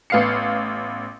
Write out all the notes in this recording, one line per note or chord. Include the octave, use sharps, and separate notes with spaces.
A1 B3 F5 C7 C#7